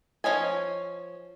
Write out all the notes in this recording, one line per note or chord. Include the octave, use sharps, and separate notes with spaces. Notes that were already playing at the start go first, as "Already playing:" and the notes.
F3 C#4 C#5 D#5 G#5